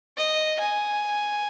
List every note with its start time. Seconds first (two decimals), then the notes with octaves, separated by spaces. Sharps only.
0.17 D#5
0.60 G#5